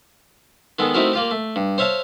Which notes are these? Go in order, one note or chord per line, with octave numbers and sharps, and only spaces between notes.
D#3 G#3 B3 A4
A3 C4 D#4 E4 F#4 A#4
A#3 F4 G4
A3
G2
C5 C#5 E5 F5 A5